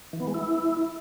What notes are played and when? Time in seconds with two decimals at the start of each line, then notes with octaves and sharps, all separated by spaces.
0.13 E3
0.20 B3
0.27 G#3
0.34 E4